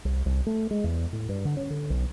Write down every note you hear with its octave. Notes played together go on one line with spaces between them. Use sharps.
C2
C2
A3
G#3
E2
A2
G2
D3
C#4
D3
B1